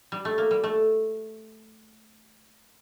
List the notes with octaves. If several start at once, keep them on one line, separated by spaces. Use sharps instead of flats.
G3
A3
A#3
G3
A3